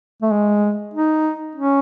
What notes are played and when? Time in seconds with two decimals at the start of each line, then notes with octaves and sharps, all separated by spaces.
0.22 A3
0.32 G#3
0.94 D#4
1.56 C#4